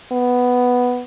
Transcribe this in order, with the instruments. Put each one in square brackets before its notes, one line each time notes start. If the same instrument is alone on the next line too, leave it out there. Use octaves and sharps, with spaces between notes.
[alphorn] B3